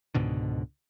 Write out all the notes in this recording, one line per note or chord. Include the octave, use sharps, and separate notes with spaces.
C#2 G#2 B2 D3